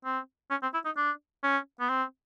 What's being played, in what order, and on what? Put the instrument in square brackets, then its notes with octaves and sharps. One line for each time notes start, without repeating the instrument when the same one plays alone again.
[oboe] C4
C#4
C4
E4
D#4
D4
C#4
B3
C4